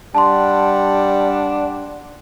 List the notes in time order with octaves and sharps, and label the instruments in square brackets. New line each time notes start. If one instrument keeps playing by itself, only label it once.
[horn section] G3 F#5 [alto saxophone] D4 [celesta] A5 C6